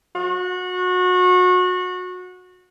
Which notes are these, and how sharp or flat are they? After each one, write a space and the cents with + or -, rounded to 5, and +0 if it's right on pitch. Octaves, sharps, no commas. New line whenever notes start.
F#4 -25